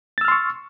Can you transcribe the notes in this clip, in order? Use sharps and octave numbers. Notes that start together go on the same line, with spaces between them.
C6 C#6 E6 F6 A6